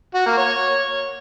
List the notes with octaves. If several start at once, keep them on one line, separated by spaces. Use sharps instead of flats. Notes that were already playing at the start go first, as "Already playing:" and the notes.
F#4
A#3
C#5